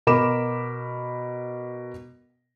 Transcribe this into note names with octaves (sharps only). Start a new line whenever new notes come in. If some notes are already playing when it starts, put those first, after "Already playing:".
B2 A#4 B5 D6 E7